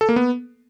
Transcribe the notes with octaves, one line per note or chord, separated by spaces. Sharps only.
A4
A#3
B3